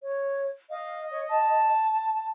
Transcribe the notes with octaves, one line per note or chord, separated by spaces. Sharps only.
C#5
D#5 F5
C#5
A5